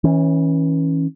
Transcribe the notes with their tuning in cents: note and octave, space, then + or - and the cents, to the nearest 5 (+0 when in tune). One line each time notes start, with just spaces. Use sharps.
E3 -30 C#4 -10